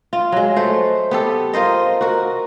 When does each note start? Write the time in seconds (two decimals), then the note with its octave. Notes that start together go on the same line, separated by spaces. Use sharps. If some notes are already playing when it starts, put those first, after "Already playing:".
0.13 F4
0.32 F#3 G#3
0.56 A3 C5
1.11 B3 G4 A4
1.53 F4 A#4 C5 D#5
2.01 F#4 A#4